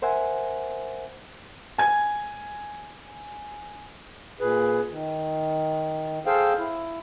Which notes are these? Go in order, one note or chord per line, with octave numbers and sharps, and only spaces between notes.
A#4 C5 E5 F#5 G#5
G#5 G#6
A#2 G#4 B4
D#3
G#4 A4 C5 F5 G5
E4